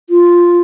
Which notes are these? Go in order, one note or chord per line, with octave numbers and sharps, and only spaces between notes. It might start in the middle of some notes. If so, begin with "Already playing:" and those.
F4